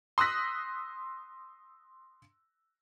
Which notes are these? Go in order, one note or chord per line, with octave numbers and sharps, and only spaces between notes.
C6 D#6 E6 F#6 A#6 B6